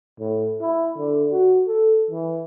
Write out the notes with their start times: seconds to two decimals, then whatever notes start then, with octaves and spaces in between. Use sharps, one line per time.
0.20 A2
0.61 E4
0.98 D3
1.32 F#4
1.67 A4
2.11 E3